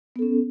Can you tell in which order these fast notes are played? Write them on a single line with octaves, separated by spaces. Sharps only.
B3 A4 C#4